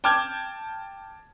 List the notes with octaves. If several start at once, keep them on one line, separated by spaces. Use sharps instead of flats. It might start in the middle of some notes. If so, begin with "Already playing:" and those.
G5 A5 D6 F6 G6 G#6